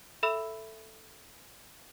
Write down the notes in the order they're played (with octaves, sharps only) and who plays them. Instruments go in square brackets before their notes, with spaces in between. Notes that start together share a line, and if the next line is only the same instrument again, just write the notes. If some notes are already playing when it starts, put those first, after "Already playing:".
[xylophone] A4 E5 B5 E6 F7